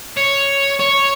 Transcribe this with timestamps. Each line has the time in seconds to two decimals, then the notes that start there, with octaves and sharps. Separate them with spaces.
0.17 C#5
0.79 C#5